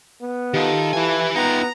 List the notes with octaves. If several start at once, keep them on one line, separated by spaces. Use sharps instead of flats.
B3
D#3 F4 G4 A4
E3 E4 G#5
B3 D#4 F4 E5 F5 G5 A#5